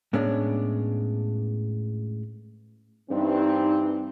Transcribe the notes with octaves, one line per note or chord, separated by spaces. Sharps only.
A2 G#3 B3 C#4 D4
G2 E3 C4 D#4